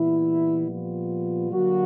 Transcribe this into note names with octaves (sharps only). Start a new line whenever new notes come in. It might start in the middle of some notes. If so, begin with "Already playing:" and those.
Already playing: A#2 E3 G3 B3 E4
F3 F4
D3 F#3 G3 A#3 F#4